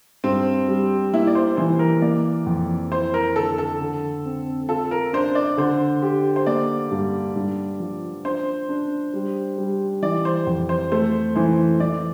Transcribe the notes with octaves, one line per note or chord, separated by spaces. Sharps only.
G2 C4
G3
A#3 E4
D5
C5
E3 C5
A#4
A#3 D5
F2
E4 C5
A#4
D3 A4
A4
D3
C4
F4 A4
A#4
D4 C5
D5
D3 C5
G4
C5
A#3 D5
G2
G2
F3
D4 C5
D4
G3
G3
E3 D5
C5
F2
C5
A3 C5
E3 C5
E3 D5